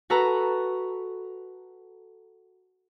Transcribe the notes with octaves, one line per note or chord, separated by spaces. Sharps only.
F#4 A4 B4 A#5